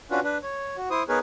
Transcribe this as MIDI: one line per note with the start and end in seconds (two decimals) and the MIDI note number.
0.11 0.20 61
0.11 0.20 62
0.11 0.20 65
0.11 0.20 66
0.11 0.20 71
0.24 0.38 62
0.24 0.38 71
0.43 0.77 73
0.77 0.89 66
0.91 1.03 64
0.91 1.03 72
0.91 1.03 87
1.09 1.19 59
1.09 1.19 63
1.09 1.19 68
1.09 1.19 70
1.09 1.19 71
1.09 1.19 73